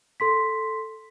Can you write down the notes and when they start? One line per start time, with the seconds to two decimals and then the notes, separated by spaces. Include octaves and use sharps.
0.20 A4 C6 B6